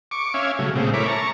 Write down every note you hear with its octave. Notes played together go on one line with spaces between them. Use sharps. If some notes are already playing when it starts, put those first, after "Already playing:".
C#6 D6
C#4 E5 F5 G#5
C#3 F#3 A3
A#2 C#3 G#3 A3 C4
E4 A#4 C#5 B5 D6
A5 A#5 C#6